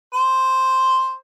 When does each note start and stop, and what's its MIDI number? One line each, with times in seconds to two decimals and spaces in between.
0.14 1.15 72